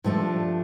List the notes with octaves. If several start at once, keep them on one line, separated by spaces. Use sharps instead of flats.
G2 F3 A3 D4